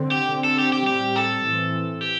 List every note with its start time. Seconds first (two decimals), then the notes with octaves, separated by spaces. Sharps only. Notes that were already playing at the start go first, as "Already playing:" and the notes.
Already playing: D3 C4
0.11 G4
0.30 D3 C4
0.44 A4
0.59 G4
0.73 G4
0.86 A2 G3 C4 G4
1.16 A4
1.44 A2 E3 C4
2.01 G4